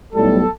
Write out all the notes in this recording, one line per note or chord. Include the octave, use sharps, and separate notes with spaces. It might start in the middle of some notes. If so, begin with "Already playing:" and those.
B1 A2 G3 A4